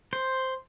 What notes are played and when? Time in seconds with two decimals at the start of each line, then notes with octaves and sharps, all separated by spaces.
0.13 C5